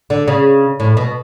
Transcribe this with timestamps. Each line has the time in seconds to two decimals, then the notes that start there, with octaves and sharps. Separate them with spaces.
0.10 D3
0.28 C#3
0.80 A2
0.97 B2